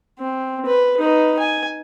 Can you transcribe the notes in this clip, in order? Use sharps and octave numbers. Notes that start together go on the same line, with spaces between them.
C4
B4
D#4 B4
G#5